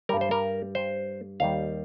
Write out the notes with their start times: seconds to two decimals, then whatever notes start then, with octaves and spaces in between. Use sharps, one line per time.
0.09 G3 A#4
0.13 G2
0.21 C5
0.31 A#4
0.75 C5
1.40 D#2 D#3 G3 F5